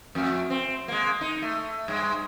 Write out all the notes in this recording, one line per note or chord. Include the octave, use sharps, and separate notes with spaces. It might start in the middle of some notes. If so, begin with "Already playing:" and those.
F2 A3
C4
G#3 A#3
D#4
A3
G2 G#3